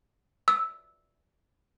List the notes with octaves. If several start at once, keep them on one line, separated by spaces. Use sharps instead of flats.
E6